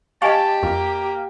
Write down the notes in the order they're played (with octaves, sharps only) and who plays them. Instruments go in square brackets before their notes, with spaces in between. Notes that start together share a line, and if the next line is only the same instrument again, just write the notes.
[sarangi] G4 [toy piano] D#5 G#5 C#6 [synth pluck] F5 [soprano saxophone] A5
[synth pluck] F2 [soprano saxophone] A#3